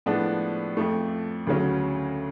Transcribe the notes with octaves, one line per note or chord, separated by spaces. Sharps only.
A2 F3 G#3 B3 D4
F2 F3 A3
D2 C#3 F#3 C#4